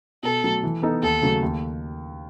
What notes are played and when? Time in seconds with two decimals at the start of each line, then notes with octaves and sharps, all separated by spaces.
0.23 B2 A4
0.44 F#3 A3
0.63 E3
0.83 B3 D#4 A4
1.02 D#2 A4
1.22 C#3 F#3 A3
1.43 D#2